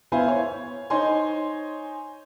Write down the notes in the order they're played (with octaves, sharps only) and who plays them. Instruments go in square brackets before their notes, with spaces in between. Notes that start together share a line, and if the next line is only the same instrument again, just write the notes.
[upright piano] B3 E4 C5 E5 F5 G#5
C#5
D#4 C5 C#5 G#5 C6